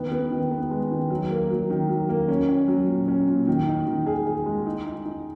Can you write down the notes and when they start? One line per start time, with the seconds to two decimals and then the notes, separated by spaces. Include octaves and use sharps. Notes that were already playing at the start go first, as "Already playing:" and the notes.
Already playing: D#3 B3
0.12 B3
0.31 D#3
0.51 B3
0.71 G#3
0.91 D#3
1.10 F#3
1.30 A#3
1.50 F#3
1.70 D#3
1.89 F#3
2.09 A#3
2.28 C#4
2.49 C#4
2.68 F#3
2.88 A#2
3.08 C#4
3.28 A#2
3.47 D#3
3.67 D#4
3.87 D#3
4.07 G#4
4.27 G#4
4.46 G#3
4.66 D#4
4.86 D#4
5.05 D#4